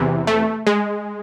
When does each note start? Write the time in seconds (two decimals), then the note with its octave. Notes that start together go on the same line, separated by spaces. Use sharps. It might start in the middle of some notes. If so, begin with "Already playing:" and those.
Already playing: E2 C3 E3
0.27 A3
0.67 G#3